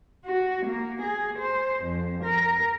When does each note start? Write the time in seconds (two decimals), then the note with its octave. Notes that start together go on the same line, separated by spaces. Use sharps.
0.25 F#4
0.65 A#3
1.02 G#4
1.39 C5
1.82 F2
2.23 A#4